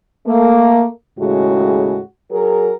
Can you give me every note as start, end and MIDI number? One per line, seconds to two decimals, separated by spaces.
0.27 0.86 57
0.27 0.86 58
1.19 1.99 39
1.19 1.99 45
1.19 1.99 49
1.19 1.99 56
1.19 1.99 66
2.30 2.72 54
2.30 2.72 68
2.30 2.72 70